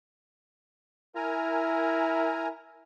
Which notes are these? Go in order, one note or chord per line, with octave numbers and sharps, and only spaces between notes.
E4 A#4 G#5 A#5